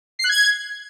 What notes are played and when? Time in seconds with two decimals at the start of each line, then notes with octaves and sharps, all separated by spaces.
0.19 C7
0.24 F#6
0.29 G#6